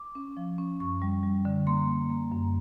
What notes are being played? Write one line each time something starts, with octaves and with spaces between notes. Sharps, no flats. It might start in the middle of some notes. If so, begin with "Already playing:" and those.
Already playing: D6
C#4
F3
C#4
F#2 C#6
G3
G3
D3
A#3 C6
A#3
A#3
F#2